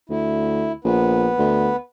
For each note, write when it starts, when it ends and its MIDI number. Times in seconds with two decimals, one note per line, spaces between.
0.10 0.72 38
0.10 0.72 64
0.84 1.30 34
0.84 1.76 59
0.84 1.76 71
1.38 1.71 38